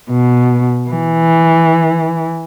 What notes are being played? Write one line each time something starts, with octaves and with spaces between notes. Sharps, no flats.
B2
E3